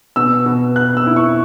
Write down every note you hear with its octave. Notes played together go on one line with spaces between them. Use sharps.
B2 E6
B2
B2 F#6
E6
E4
C#6